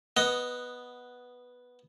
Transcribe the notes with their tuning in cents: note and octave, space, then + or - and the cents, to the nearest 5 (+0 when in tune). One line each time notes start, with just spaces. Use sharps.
B3 +0 D#5 +0